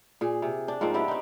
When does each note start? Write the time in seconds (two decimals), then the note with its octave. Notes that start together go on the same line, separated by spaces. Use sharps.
0.21 A#2 G#4
0.42 C3
0.68 D4
0.81 G#2 F3 A#3 C4
0.94 B3 D4 E4 G4
1.08 C4 D#4